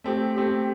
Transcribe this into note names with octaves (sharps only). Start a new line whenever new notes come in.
A3 C4 G4
A3 C4 G4